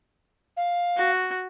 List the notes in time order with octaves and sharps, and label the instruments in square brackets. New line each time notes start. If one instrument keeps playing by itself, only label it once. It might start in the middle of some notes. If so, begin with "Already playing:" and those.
[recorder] F5
[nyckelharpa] F#4